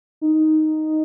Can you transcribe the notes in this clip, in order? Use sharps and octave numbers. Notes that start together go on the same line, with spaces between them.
D#4